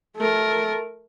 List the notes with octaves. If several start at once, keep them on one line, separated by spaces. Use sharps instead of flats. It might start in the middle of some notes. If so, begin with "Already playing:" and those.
A3 A#4